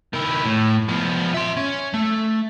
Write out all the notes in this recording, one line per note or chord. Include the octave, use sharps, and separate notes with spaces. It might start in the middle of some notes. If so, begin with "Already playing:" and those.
D#3 E4
A2
F3 B3
E5 C6
C#4
A3